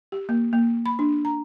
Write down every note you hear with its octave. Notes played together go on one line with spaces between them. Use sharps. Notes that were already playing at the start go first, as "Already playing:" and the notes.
G4
A#3
A#3
B5
D4
A#5